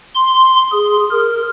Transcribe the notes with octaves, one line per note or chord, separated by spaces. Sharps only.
C6
G#4
A#4